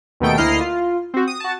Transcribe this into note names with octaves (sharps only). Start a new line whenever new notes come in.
D#2 B2 D#3 A3 G5 D7
D2 A#3 E4 D#5 F6 C7
F4
C4 F#4
D#6
F#4 A5